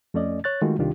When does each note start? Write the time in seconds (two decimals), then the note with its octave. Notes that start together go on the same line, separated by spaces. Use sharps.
0.14 F2 A3 C#4 D5 D#5
0.44 C#5 F#6 A6
0.62 D#3 G#3 A3 F4 F#4
0.79 C2 D#3 D4 F4 G4